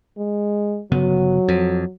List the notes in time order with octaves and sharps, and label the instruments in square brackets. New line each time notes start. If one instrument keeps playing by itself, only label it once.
[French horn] G#3
[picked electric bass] G1 C#3 B3 [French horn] F#3
[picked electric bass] F2